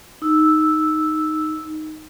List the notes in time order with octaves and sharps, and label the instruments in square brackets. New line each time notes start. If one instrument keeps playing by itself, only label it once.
[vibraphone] D#4 E6